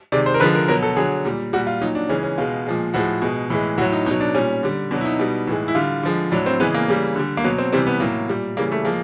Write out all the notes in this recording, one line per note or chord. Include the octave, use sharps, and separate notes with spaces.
C3 D#3 G#3 D5
C5
A#4
D3 F3 G#3 B4
A#4
B2 F#3 A#4
A4
D3 F#3 G#4
A#2 G3
A#2 G3 F#4
F4
A#2 F#3 D#4
D4
C#3 E3 G#3 C#4
C#4
B2 G#3 F4
A#2 F3 G#3
A2 F3 G#3 F#4
B2 G#3
A2 E3 G#3
A2 F#3 F#4
D#4
B2 F#3 D#4
D4
A#2 G3 C#4
D3 G3
B2 F#3 D4
E4
D#4
B2 G3
A2 E3 G#3
E4
D3 G3 F4
D3 F3 G#3
A2 F#3 D4
C4
C#3 E3 G#3 B3
A#3
C#3 E3 G3
D3 G3
A#3
B2 F#3 B3
C4
C3 E3 G3 C4
B3
A2 F#3 A#3
A#2 G3
C#3 E3 G3 A#3
A3
F3 G#3 A#3